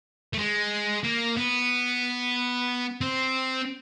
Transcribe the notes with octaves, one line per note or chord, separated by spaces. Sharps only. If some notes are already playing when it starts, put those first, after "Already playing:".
A3
G#3
A#3
B3
C4